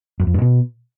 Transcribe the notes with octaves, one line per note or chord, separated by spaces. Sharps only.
F#2
F2
G2
B2